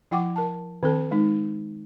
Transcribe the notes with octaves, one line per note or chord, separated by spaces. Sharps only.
F3 E4 F#5 G5 C#6 D6
A#4 A5
D#3 C4 A4 A5
G#3 D#4